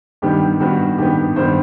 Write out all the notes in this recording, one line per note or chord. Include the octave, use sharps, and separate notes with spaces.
G2 D#3 G3 B3 G4
G2 D#3 G3 B3 F#4
G2 D#3 G3 B3 G4
G2 D#3 G3 B3 C5